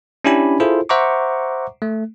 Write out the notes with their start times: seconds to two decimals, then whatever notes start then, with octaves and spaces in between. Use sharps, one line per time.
0.25 C#4 D4 E4 G4 G#5 B5
0.60 E4 F4 G#4 A4 C5
0.89 C5 E5 F#5 A#5 C#6 D6
1.82 A3